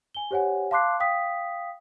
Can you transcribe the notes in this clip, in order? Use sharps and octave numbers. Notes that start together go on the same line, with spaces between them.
G#5 G7
G4 C5 C#5 F#5 G#5
F5 A5 C6 D6 F#6 C7
F5 G5 D#6 B6